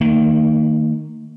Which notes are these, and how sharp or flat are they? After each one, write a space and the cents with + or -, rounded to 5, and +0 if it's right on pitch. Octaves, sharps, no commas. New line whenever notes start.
D#3 -5 A#3 -45